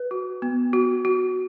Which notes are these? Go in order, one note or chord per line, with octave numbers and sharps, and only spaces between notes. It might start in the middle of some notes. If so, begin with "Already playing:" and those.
Already playing: B4
F#4
B3
F#4
F#4